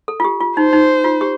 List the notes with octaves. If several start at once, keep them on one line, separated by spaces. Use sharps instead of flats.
A4
F4
G4
F4
D#4 C5
D#4
F4
G4